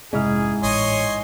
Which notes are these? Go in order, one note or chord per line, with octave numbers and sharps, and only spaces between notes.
F1 G#2 C3 C#4 E4 G#4 F6
A1 C#5 D#5 G#5 C6